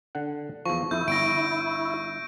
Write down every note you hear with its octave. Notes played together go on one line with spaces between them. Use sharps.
D3 F#5
E2 F3 C#6
F2 E4 G6
G1 A#6 D7